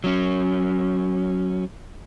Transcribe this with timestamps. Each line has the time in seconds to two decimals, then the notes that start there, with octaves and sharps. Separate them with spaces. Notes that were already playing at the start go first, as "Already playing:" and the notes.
0.04 F#3 C#4